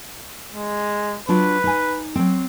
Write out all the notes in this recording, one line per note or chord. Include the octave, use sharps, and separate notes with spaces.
G#3
F#3 D4 F4 B4
D#4 G#5
F#3 C4